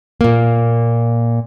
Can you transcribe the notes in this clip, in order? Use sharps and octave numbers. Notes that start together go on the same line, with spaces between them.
A#2 A#3